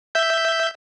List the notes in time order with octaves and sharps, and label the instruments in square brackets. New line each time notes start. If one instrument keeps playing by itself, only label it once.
[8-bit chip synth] E5 G6